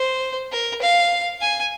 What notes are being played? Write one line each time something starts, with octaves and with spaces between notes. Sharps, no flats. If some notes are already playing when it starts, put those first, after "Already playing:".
Already playing: C5
A#4
F5
G#5